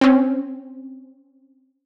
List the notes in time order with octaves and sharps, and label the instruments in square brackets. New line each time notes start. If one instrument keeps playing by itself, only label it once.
[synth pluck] C4 C#4